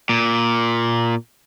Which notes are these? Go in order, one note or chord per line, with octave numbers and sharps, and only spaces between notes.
A#2